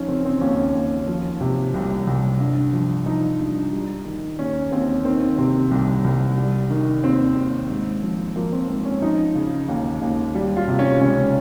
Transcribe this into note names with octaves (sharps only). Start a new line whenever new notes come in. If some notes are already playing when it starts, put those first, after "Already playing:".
Already playing: F3 C#4 D#4
C#3 C4
C4
D#2 C#4
D#2
F3
C3
C2
C2
G2
F3
F3 D#4
G2
G3
D#3
D#2 C#4
D#2 C4
D#3 C4
C3 C4
C2
C2
G3
D#3
D#2 C4
D#2
G#2
F3
F3 A#3
C4
G#2 C4
C#4
F3 D#4
C#3
D#2
D#2
G3
F4
C3
C#4
C#2 C#4